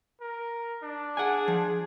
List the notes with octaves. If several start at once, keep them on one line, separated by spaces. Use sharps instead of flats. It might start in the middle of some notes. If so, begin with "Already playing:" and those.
A#4
D4
G#4 F#5 G#5
F3